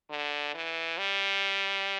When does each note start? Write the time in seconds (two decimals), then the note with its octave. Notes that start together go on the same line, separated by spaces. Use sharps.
0.10 D3
0.54 E3
0.98 G3